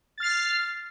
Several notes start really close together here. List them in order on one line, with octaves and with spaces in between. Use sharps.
A6 F6 C7